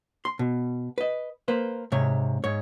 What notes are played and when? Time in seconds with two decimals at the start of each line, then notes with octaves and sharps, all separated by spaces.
0.25 C6
0.39 B2
0.98 B4 D#5
1.48 A#3 B4 C5
1.92 G#2 C3 C#5
2.44 G#2 C#5